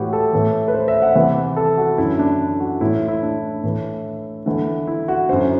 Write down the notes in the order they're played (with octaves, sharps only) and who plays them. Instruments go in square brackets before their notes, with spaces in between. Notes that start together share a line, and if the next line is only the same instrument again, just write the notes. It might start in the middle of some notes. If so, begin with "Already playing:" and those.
Already playing: [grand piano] A2 E3 E4 F#4 G4
A4
A2 E3
B4
C5
E5
F#5
E2 C3 E3 F#5
A4
F#4
F#2 D3 E4
D4
F#4
A2 E3 E4
E4
E4
D4
A2 E3
E2 D3
E4
F#4
F#2 D3 C5